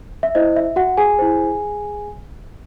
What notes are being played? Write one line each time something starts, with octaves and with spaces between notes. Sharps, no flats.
E5
E4 C5 D#5
E5
F#4 F#5
G#4 G#5
E4 C5